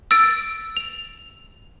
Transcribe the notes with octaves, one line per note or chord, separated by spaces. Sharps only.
E6 A6 D7
F7